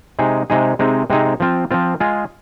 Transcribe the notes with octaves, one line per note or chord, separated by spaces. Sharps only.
C3 G#3 D#4 G#4
C3 G#3 D#4 G#4
C3 G#3 C4 D#4 G#4
C3 G#3 C4 D#4 G#4
F3 C4 F4
F3 C4 F4
G#3 F4 G#4